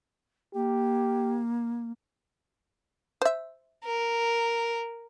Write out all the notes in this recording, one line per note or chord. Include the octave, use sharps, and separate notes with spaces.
A#3 G4
C5 E5
A#4